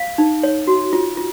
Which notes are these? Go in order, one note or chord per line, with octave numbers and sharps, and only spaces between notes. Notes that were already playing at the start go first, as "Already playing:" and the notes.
Already playing: F5
D#4
C#5
F#4
F4
F4